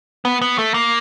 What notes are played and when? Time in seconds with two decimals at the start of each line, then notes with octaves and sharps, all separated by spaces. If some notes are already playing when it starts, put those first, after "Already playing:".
0.25 B3
0.42 B3
0.59 A3
0.74 A#3